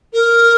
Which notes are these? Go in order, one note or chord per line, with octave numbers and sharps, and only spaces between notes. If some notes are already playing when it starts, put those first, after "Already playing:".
A#4